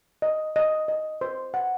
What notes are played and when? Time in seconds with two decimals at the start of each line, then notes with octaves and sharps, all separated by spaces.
0.22 D#5
0.56 D#5
0.88 D#5
1.21 C5
1.54 F#5